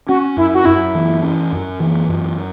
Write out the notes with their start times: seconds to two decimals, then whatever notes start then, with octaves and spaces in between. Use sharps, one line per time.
0.08 C#4 F#4
0.37 F#2 E4
0.55 F#4
0.65 F#2 E4
0.95 E3
1.23 C#4
1.52 F#2
1.80 E3
2.09 F#2